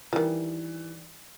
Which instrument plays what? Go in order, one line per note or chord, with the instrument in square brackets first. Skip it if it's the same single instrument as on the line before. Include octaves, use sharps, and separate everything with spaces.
[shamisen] D#3 G3 [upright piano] E3